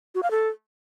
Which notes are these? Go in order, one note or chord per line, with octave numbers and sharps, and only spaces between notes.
F#4
F5
A4